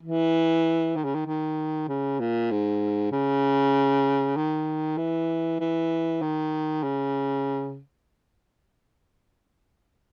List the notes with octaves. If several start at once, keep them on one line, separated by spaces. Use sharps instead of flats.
E3
D#3
C#3
D#3
D#3
C#3
A#2
G#2
C#3
D#3
E3
E3
D#3
C#3